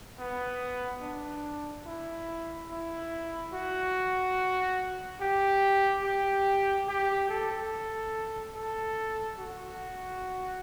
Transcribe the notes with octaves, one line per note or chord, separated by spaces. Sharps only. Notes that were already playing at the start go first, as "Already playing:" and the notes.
B3
D4
E4
E4
F#4
G4
G4
G4
A4
A4
F#4